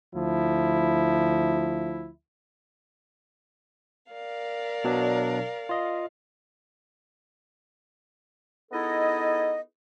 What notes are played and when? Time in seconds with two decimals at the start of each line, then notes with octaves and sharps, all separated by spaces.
0.15 D2 F3 E4
4.11 A#4 D5 F5
4.84 B2 F#3 D4
5.69 F4 D#5
8.72 B3 D#4 E4 G#4 A4 D#5